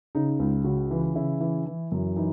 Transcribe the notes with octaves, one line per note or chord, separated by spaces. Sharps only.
C#3 D#4
C#2
C#3 F#4
E3
C#3 E4
E3
E3
F#2
E3 D#4